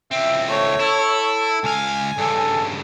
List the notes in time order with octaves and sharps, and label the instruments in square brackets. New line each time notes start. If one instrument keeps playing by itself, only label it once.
[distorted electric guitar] C#2 C4 [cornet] E5
[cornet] A3 [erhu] C#5
[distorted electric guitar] E4 [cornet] A4
[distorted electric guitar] C#2 F5 [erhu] G#5
[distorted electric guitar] G2 C#3 [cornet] A4